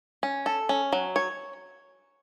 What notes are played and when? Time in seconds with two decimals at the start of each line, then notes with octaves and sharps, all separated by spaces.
0.23 C#4
0.46 A4
0.69 C#4
0.93 F#3
1.16 C#5